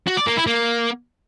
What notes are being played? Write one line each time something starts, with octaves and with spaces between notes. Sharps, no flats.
F#4
D5
A#3
E4
A#3